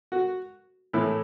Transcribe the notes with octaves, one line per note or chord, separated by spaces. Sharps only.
F#4
A2 E3 A3 E4